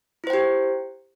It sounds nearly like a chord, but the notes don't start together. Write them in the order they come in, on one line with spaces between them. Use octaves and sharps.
E4 C5 G5 G4